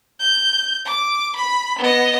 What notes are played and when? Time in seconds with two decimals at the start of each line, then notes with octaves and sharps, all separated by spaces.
0.20 G6
0.85 D6
1.36 B5
1.79 B3 D#5